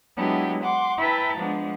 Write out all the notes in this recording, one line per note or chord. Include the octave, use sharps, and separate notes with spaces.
F#3 G#3 B3 D4 E4 G4
F#5 C6 D6
E4 B4 E5 G5 A5 A#5
F3 G#3 B3 D4